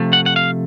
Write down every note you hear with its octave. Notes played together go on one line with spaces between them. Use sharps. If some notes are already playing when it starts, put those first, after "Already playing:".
Already playing: C3 F3 A3
F#5
F#5
F5